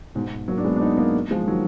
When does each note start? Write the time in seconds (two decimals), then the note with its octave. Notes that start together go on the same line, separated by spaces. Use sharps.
0.15 G#2 B2
0.48 F#3 A#3
0.57 D4
0.64 G#3 B3
0.76 D4
0.81 B3 D#4
0.97 A#3 D4
1.31 F3 G#3
1.47 D#3 F#3